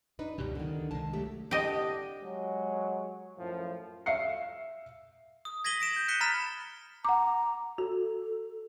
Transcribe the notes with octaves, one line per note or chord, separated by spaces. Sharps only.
D4 D#4 B4
C#2 F#2 B2 F#3 G3
D3 D#3
D4
C2 D#3 G#3 A5
F#3 A3 G4
C2 D3 D4 G4 D#5
F#3 G#3
F#2 A2 F3
E5 F5 C7 C#7
D#6
G#6 A#6 B6 D#7 F#7 G7
A#6 D7 E7
G6
F#6 B6 C#7 D#7 G7
A#5 B5 F6 A6 B6 E7
F#5 A#5 D6
F#4 A4